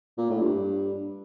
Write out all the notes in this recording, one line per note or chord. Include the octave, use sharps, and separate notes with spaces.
A#2
A2
G2